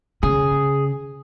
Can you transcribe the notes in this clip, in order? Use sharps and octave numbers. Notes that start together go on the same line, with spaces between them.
C#3 G#4